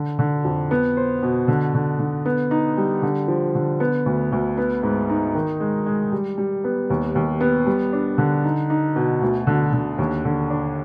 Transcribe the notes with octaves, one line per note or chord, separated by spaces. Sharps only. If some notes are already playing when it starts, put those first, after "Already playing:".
Already playing: D3
D3
F2
B3
C5
B2
D3
D3
D3
B3
D#4
G3
D3
F3
D3
B3
D2
D2
B3
G#2
D#4
D#3
G#3
G#3
G3
G3
B3
D#2
D#2
B3
G3
D4
D3
D#4
D#4
B2
D2
D3
D3
D#2
D3
D4